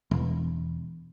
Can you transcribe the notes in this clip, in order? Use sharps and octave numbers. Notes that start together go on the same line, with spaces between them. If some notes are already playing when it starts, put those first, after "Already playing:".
E1